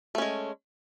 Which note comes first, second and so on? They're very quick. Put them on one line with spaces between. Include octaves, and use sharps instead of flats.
A3 C#4 G#3